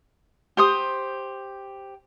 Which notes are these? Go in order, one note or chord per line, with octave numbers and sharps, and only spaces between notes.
G4 C5 D#6